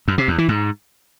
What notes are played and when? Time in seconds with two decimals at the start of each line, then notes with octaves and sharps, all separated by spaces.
0.08 F#2
0.18 C3
0.28 E2
0.38 E3
0.48 G#2